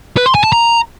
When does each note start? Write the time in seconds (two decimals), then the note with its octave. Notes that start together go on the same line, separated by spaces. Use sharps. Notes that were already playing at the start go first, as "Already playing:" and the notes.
0.17 B4
0.26 C6
0.35 G#5
0.44 A5
0.52 A#5